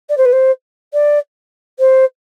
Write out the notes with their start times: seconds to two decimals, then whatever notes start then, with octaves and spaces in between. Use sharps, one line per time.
0.09 D5
0.17 C5
0.25 B4
0.32 C5
0.93 D5
1.79 C5